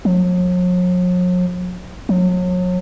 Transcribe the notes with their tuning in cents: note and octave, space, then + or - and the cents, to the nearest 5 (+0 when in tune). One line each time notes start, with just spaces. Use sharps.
F#3 -45
F#3 -35